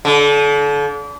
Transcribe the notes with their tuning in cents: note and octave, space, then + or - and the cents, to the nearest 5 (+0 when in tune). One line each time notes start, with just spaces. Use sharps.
D3 -35